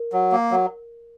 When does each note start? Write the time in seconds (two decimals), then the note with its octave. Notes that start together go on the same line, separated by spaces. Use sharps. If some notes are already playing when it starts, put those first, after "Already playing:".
Already playing: A#4
0.13 F#3
0.32 A#3
0.51 F#3